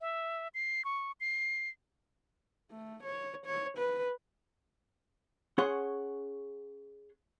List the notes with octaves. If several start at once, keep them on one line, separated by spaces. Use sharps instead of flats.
E5
C7
C#6
C7
A3
C#5
C#5
B4
C#4 G#4 C#5 F#5 C6